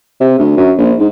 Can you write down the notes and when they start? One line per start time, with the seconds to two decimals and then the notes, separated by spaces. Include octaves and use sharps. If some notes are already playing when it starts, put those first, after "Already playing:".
0.20 C3
0.38 D2
0.57 F#2
0.78 A#1
0.99 G#2